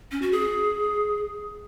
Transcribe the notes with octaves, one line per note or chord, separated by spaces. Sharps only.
C#4
F#4
G#4